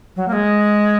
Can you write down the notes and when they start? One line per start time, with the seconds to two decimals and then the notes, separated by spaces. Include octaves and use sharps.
0.16 F#3
0.28 A#3
0.33 G#3